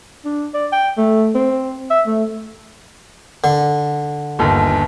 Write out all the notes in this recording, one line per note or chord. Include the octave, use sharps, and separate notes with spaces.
D4
D5
G5
A3
C4
E5
A3
D3
G1 D#2